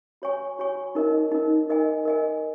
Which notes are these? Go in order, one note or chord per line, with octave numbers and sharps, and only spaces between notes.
F#4 C#5 G#5 C#6
F#4 C#5 G#5 C#6
D#4 A#4 D#5
D#4 A#4 D#5
A#4 D#5 G#5
A#4 D#5 G#5